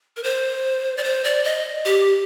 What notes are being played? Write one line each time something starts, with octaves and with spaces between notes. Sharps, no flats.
A#4
C5
D5
C5
D5
D#5
G4